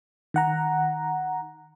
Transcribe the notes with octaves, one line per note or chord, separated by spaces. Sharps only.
D#3 F#5 A#5